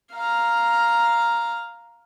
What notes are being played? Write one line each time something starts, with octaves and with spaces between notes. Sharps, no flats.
F5 A#5